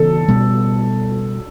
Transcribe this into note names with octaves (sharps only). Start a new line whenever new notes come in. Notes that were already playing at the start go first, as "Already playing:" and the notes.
Already playing: C#3 E3 B3 A4
B2 G3 B3